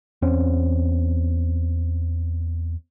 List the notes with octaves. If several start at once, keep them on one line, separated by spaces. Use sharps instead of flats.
E2 C4 C#4